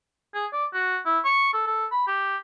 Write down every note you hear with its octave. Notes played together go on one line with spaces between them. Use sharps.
G#4
D5
F#4
E4
C#6
A4
A4
B5
G4